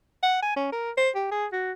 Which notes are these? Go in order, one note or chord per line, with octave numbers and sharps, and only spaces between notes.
F#5
G#5
C#4
A#4
C5
G4
G#4
F#4